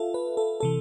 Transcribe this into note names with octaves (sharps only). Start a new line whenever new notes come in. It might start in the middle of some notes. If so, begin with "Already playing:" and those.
Already playing: F4 A4 E5 F5
B4
A4
C3 E3 A4